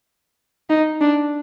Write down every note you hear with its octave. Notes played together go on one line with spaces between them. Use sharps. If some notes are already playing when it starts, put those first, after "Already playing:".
D#4
D4